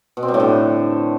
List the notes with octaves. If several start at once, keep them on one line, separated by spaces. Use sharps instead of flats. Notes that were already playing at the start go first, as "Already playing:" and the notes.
B2
C4
G3
A2
D3